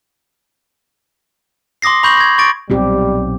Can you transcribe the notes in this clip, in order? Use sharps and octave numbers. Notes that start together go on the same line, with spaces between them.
C6 D6 D#6 A#6 C7
B5 C#6 G6 A#6 F7 F#7
G#6 A#6
C#6 D6 A6 D7
B1 A#2 G3 C4 G4